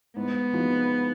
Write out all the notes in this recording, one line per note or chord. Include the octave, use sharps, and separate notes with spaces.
G#2 B3
F3 G#3 D#4 F#4